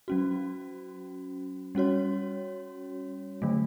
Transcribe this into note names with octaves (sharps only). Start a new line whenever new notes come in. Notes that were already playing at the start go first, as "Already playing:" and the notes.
F#3 C#4 F#4
G3 C#4 F#4 C#5
D3 F#3 A3